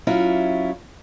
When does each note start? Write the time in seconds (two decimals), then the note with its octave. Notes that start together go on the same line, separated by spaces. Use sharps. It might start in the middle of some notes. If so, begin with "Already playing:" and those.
0.07 F#3 C#4 E4 F4